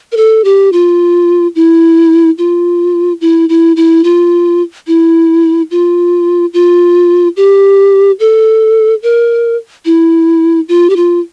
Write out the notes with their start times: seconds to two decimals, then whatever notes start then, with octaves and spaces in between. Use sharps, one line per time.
0.12 A#4
0.17 A4
0.45 G4
0.73 F4
1.55 E4
2.38 F4
3.21 E4
3.49 E4
3.76 E4
4.04 F4
4.87 E4
5.71 F4
6.53 F4
7.37 G4
8.20 A4
9.03 A#4
9.85 E4
10.69 F4
10.90 G4
10.96 F4